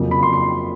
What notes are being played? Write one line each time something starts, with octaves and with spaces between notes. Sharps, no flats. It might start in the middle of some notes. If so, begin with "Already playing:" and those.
Already playing: F2 C#3 F#3 A#3
B5
C6
C6